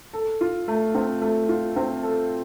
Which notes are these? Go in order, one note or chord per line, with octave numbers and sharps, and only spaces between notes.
A4
F4
A3
C4
A3
F4
C4
A4